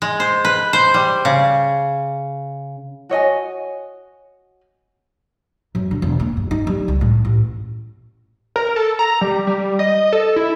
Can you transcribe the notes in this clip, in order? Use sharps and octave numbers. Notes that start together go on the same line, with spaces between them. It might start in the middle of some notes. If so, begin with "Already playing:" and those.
G#3
C5
B4
C5
G3
C#3
F#4 C#5 D#5 G#5
F#2
D3
E1
A#3
G2
D#4
G3
C#2
A2
A1
A#4
A4
A#5
G3
G3
D#5
A4
E4